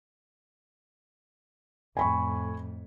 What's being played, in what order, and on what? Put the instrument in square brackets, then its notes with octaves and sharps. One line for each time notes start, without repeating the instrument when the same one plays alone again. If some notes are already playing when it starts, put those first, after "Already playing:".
[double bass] F2 A2 [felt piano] G#5 B5 C#6